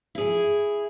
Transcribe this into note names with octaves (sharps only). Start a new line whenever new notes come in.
E4 G#4